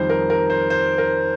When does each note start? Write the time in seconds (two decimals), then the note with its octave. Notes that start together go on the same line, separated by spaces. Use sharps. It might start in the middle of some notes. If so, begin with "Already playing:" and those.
Already playing: F2 D#3 G3 C5
0.10 A#4
0.30 A#4
0.50 C5
0.70 C5
0.98 A#4